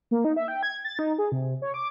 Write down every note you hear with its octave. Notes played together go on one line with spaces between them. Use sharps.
A#3
D#4
E5
G5
G#6
A6
D#4
G#4
C3
C#5
D6